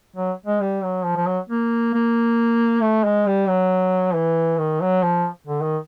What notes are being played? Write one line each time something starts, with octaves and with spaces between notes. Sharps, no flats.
F#3
G#3
G3
F#3
F3
F3
F#3
A#3
A#3
A3
G#3
G3
F#3
E3
D#3
F#3
F3
D3
D#3